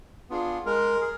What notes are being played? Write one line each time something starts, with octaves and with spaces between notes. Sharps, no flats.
B3 D4 F4 G#4
G#3 A#4
G#4